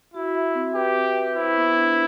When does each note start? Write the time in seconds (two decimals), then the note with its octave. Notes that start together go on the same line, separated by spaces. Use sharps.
0.14 E4 F#4
0.35 E5
0.55 C4
0.75 G4 B4
0.96 C4
1.15 B4
1.35 E4 C5
1.56 B3
1.76 D4